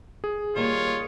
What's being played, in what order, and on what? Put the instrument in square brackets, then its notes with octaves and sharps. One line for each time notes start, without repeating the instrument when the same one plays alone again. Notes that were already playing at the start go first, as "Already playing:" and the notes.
[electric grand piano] G#4
[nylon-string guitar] D#3 G3 A#3 [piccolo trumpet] F4 [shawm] C#5